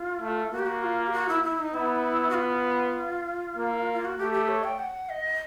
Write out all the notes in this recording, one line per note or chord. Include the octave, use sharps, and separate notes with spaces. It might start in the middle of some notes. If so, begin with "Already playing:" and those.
Already playing: F4
A3
A#3 F#4
G4
F#4
F4
G4
F#4
E4
E4
D#4
B3 E4
F#4
F4
A#3
F4
F#4
A3 G4
G4
C#5
G5
F#5
D#5